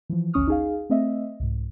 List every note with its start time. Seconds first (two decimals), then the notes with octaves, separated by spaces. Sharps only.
0.09 E3 F3
0.33 G#1 D2 C#4 C#6 D#6 F6
0.47 D#4 G#4 F5
0.90 A3 C4 D#5 E5
1.40 C2 G#2